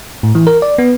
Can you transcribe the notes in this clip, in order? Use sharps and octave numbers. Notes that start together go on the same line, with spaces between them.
A2
E3
A#4
D5
B3